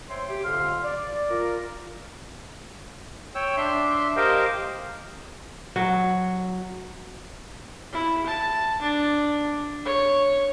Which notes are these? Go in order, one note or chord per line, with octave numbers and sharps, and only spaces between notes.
C5 C#5 E5 G5 C6
G4
F2 D3 F5 C6 F6
D5
F4 A#4
C#5 G5 E6
D4 E5 C6
G4 A#4 C5 D#5 F5 G5
F#3
E4
A5
D4
C#5